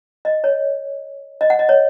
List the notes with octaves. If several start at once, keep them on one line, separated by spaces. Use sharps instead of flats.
D#5
C#5
D#5
F#5
D#5
C#5